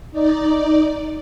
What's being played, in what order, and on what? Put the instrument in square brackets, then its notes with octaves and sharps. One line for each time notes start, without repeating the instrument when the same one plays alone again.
[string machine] D#4 D5